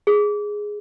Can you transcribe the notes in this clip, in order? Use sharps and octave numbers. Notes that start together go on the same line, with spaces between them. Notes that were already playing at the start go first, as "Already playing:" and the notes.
G#4